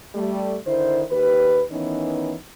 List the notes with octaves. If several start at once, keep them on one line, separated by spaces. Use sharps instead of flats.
G3 A3
D3 D#3 E4 C5
D#2 G4 B4
D#3 E3 B3 C#4 D#4